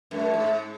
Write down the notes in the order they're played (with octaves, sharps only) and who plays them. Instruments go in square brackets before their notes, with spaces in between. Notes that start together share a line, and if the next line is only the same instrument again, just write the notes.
[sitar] F#2 [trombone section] A3
[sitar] G#2